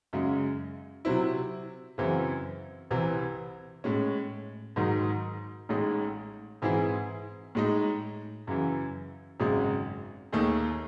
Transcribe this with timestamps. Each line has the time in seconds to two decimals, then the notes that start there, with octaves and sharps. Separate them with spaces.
0.13 F#2 C#3 G#3
1.05 C3 F#3 C4 E4
1.98 F#2 C#3 E3 C4
2.91 C2 C3 E3 C4
3.84 A2 G#3 C#4
4.76 G#2 D#3 F#3
5.69 A1 A2 G#3 D#4
6.62 G#2 E3 C4 E4 G#4
7.55 A2 G#3 D#4
8.47 F#2 C#3 E3
9.40 G#1 F#2 C#3 G#3
10.32 D#2 D#3 A3 D#4 G#4